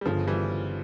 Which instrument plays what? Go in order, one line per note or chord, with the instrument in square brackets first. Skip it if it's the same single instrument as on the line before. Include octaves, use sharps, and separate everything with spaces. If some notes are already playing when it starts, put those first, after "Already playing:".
[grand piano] G3
[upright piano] G1 [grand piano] C#3 F3
[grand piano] E3 G3